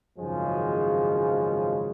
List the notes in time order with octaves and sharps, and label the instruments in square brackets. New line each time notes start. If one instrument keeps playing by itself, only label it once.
[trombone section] G#1 F#2 C#3 F3 G#3